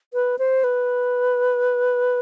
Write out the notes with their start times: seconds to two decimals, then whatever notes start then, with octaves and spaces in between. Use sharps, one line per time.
0.14 B4
0.39 C5
0.64 B4